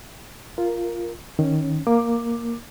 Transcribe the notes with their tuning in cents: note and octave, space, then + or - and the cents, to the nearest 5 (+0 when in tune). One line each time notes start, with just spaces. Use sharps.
F4 -5 A#4 +0
D#3 +5 C#4 +0
A#3 +0 D6 +10